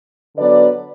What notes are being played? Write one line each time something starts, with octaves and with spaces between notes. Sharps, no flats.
D3 F#3 B3 B4 D5